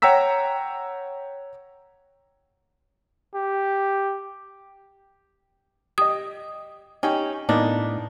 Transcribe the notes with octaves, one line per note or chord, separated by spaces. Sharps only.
C#5 F#5 G5 A#5 E6 B6
G4
G4 D#5 D#6
C#4 D#4 G4 G5
A2 A#3 B3 D4 D#4